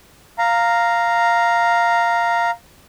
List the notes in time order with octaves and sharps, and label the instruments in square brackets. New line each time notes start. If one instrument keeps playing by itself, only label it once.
[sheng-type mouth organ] F5 A#5